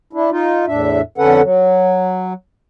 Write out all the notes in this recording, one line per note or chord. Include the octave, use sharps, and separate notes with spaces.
D4 E4
D#4 F4
E2 A2 D4 E5
F2 D3 C#4 A4 B4 F#5
F#3